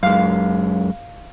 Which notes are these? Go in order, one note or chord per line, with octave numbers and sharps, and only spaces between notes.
F#2 G#3 F5